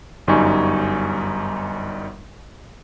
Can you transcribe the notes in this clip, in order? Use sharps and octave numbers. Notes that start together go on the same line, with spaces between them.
G1 F#2 G3 D#4 G#5 C#6